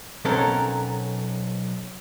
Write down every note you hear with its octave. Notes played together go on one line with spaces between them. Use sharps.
B1 F#3 C4 C#4 A4 A#4